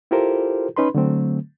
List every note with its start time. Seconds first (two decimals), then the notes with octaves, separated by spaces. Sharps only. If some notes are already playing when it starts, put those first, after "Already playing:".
0.11 E4 F4 G4 A4 A#4 C5
0.76 C#4 D#4 B4 B5 C6
0.95 D3 F#3 A3 C4